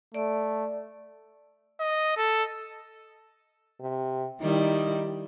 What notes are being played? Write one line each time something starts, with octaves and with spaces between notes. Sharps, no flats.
A3 D5
D#5
A4
C3
D#3 G3 D#4 E4